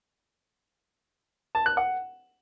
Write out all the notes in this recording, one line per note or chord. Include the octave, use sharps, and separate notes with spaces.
A5
F#6
F#5